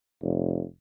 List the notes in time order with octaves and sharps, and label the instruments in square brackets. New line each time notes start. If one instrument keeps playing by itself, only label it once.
[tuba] F1